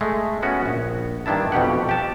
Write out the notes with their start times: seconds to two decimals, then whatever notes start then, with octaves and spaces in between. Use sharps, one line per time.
0.01 G#3 A3
0.42 B3 C#4 F#4
0.66 A#1
1.26 G2 D#3 D4 E4 A5
1.52 F2 B2 G4 F#5
1.89 G4 A5